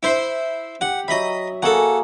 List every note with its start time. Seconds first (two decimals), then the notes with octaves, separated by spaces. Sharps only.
0.03 E4 C5 C6
0.81 G4 F#5 G5
1.08 F#3 D#5 E5 B5
1.63 A#3 F#4 G#4 A4 F#5